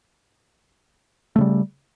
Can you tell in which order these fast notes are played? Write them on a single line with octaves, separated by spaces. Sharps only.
A3 C#3 G3